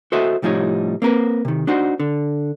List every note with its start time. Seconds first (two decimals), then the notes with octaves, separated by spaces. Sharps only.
0.12 F#4 A4 C5 D#5 E5
0.42 C2 A2 F3 G3 D#4 C#5
1.02 A#3 C4 A#4 B4
1.45 C3 D#3
1.67 D4 D#4 F#4 C5
2.00 D3